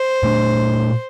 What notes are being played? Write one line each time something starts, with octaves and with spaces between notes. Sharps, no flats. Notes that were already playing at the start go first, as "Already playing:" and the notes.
Already playing: C5
A#2 A3 D4